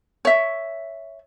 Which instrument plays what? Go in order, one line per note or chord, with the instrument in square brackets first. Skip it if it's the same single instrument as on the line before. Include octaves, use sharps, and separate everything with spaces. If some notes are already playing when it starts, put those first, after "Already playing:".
[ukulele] C#5 E5